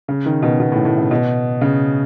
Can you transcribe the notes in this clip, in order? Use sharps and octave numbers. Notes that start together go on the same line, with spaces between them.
C#3
D#3
B2
B2
A2
A2
C#3
B2
C#3